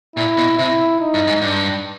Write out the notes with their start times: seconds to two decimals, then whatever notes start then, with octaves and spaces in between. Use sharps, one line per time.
0.16 A#2 E4
0.37 B2
0.58 C3 E4
1.00 D#4
1.14 G2
1.27 G#2
1.42 G2 D4